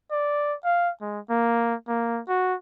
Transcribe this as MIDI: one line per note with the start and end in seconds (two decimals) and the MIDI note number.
0.11 0.55 74
0.64 0.90 77
1.01 1.20 56
1.30 1.74 58
1.88 2.22 58
2.28 2.55 66